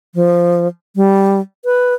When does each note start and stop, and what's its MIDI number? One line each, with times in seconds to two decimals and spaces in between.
0.15 0.67 53
0.96 1.40 55
1.65 1.94 71